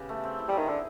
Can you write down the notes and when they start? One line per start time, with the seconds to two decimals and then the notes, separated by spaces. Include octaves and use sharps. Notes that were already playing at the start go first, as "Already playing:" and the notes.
Already playing: C#3 B3 G4
0.09 A3
0.24 C4
0.39 E4
0.48 G3
0.53 D#3 G#4
0.68 D3 G#4